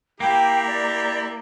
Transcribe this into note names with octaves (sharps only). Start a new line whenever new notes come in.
A#3 E4 G4 G5 A#5
D5